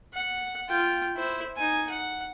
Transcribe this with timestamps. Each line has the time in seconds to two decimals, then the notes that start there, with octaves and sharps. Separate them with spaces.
0.13 F#5
0.69 F4 G5
1.16 E4 C5
1.56 D#4 G#5
1.90 F#5